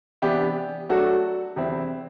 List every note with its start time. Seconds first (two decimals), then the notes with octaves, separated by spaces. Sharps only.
0.22 C3 E3 B3 D4 G4
0.89 F#3 A3 D4 F#4 A4
1.56 E2 C3 G3 C4 E4